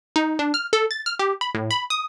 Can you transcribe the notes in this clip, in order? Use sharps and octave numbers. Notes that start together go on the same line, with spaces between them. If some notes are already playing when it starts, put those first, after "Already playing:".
D#4
D4
F6
A4
A6
F6
G4
B5
A2
B5
D#6